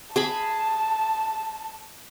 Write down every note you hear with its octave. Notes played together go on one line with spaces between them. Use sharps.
G#4 G#5 A5 B5